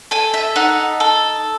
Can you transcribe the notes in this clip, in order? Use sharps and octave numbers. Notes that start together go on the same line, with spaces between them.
A4 G#5
E5
D#4 F#5
A4